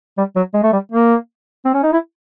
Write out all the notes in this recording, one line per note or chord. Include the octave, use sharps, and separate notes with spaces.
G3
F#3
G#3
A3
G3
A#3
C4
C#4
D#4
E4